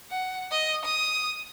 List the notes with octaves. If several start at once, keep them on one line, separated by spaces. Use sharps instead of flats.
F#5
D#5
D#6